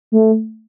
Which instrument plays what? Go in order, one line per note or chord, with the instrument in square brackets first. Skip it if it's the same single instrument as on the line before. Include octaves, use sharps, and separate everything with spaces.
[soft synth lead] A3